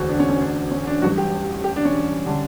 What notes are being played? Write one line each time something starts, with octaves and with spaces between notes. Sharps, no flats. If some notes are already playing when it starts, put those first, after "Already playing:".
Already playing: E1 D2 D3 F#4
D4
C#4
C#4
D4
C#4
D4
A1 G2 F#3 F#4
G4
G4
D4
C#4
D3 G3 D4 G4